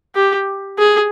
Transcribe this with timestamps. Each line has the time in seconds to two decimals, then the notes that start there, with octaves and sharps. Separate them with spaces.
0.15 G4
0.79 G#4